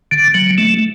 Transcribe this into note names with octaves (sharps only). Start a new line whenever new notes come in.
D3
F#3
A3